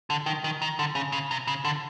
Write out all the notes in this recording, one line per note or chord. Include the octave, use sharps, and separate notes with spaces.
D3
D#3
D#3
D#3
D3
C#3
C#3
C3
C#3
D3